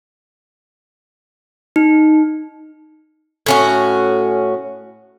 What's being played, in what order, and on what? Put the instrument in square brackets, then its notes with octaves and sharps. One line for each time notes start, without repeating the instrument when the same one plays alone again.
[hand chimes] D#4
[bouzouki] A2 C#4 F#4